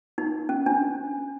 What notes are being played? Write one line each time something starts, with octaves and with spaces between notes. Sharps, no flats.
D#4
C#4
D4